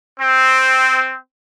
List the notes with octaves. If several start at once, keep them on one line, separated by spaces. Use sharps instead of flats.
C4